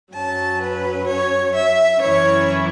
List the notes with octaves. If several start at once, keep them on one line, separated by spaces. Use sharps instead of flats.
F#2 F#3 C#4 A5
B4
C#5
E5
F#2 E3 C#4 E4 C#5